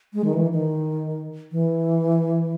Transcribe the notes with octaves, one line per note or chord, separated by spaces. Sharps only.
G#3
D#3
E3
D#3
E3